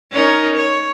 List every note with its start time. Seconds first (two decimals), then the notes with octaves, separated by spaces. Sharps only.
0.12 C#4 D#4 A#4
0.56 C#5